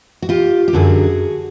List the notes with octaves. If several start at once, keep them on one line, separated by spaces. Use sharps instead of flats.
F#4
F4 G4
G4
F#2 D3 F#3 F#4 G#4